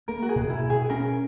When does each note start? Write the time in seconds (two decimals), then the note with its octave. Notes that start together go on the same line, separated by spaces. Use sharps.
0.08 A#3 A#4
0.22 F#4
0.29 G#4
0.36 B2
0.49 E4
0.63 B2
0.70 G#4
0.90 C#4 A#4